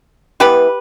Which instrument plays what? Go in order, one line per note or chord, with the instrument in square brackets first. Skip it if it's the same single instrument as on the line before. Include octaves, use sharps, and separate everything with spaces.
[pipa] E3 B3 G4 B4